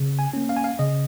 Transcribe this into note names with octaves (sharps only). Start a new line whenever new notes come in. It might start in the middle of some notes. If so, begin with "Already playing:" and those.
Already playing: C#3
G#5
A#3 C#4
F5
G#5
F5
C#3 D#5